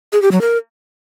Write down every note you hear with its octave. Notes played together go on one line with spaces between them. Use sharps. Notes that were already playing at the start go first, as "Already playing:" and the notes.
G#4
G4
F#3
A#4